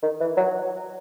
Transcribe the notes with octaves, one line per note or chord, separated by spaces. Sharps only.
D#3
E3
F#3